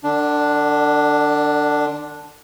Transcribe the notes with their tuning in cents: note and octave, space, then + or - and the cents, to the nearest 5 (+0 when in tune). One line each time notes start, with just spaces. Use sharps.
D3 +35 D4 +0